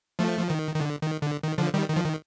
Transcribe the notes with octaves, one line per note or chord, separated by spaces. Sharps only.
F3 A3
F3
D#3
D#3
D3
D#3
D3
D#3
D3 F3
D#3 G3
D#3
F3
D#3